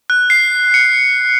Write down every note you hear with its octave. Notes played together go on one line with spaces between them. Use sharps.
F#6
C7
C#7